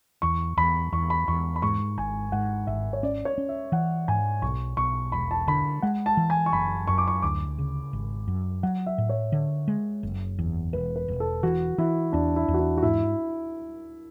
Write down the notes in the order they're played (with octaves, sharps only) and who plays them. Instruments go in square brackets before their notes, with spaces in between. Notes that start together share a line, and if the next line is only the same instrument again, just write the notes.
[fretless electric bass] E2 [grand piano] C#6
[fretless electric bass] E2 [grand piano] B5
[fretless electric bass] E2 [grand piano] C#6
[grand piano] B5
[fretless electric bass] E2 [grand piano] C#6
[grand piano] B5
[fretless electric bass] G#2 [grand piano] C#6
[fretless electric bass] G#1 [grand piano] G#5
[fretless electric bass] G#2 [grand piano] F#5
[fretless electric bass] G#1 [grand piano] E5
[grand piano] C#5
[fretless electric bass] C#4 [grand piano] D5
[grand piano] C#5
[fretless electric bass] C#4
[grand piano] E5
[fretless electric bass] E3 [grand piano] F#5
[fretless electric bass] G#2 [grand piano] G#5
[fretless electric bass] B1 [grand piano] C#6
[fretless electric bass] B1 [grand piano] C#6
[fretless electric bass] E1 [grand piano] B5
[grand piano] A5
[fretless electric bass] D3 [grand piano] B5
[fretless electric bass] G#3 [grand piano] F#5
[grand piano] A5
[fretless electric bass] E3
[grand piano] G#5
C#6
[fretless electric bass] F#1 [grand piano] B5
[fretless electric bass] F#2 [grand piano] C#6
[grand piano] D6
C#6
[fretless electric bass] D2 [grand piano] D6
[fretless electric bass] C#3
G#1
F#2
[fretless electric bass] F#3 [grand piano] F#5
[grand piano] E5
[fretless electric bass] A2
[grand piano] C#5
[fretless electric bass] D3
G#3
F#1
E2
[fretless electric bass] E1 [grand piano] B4
[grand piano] B4
[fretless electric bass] E1
[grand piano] A4
[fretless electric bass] E3 [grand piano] F#4
[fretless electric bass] E3 [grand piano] E4
[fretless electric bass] E2 [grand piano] D4
[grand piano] E4
[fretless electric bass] E2
[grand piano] F#4
E4
F#4
[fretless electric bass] G#2 [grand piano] E4